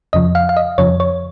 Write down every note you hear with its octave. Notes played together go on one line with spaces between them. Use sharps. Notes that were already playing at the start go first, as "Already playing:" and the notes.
F2 C#3 F3 D#5
F5
F5
D#5
F2 C#3 F3 C#5
C#5